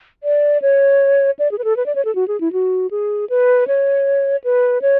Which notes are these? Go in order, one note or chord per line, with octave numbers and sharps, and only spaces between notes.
D5
C#5
D5
G#4
B4
A4
B4
D5
C#5
A4
F#4
G#4
E4
F#4
G#4
B4
C#5
B4
C#5